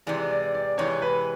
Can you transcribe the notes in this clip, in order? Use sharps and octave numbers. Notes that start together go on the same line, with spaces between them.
C3 E3 G#3 D5
D5
D5
C3 E3 G#3 C#5
B4